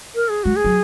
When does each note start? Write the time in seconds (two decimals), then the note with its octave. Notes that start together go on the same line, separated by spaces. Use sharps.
0.15 A#4
0.29 G#4
0.44 G#3 F#4
0.56 G#4
0.65 F#3